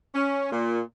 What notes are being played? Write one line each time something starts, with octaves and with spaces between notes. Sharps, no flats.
C#4
A#2